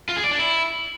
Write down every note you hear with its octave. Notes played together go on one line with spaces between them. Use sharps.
F4
G#4
D5
D4
E4